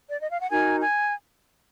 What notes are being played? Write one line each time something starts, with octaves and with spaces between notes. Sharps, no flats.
D5
D#5
F5
F#5
D#4 F#4 A#4 G#5
G#5